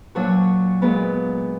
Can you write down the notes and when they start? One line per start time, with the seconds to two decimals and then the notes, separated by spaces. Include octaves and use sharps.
0.15 A#2 F#3 D4 F#4
0.82 A#2 G#3 B3